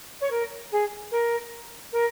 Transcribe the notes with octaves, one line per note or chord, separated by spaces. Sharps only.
C#5
A#4
G#4
A#4
A#4